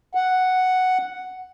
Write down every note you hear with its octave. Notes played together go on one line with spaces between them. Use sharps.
F#5